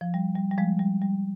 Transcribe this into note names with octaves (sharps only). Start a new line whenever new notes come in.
F3
G3
G3
G3
F3 G#3
G3
G3